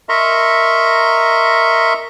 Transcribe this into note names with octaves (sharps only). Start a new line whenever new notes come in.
A#4 D#5 E5 A#5 C6 C#6